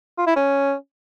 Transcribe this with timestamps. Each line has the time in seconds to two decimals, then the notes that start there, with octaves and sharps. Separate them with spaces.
0.18 F4
0.27 E4
0.36 C#4